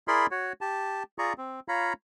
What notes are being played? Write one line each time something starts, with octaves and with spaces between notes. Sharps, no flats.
E4 G#4 A#4 D5 B5 C6
F#4 C#5
G4 A5
F4 G#4 D5 A#5 C#6
C4
F4 C#5 F5 A#5 B5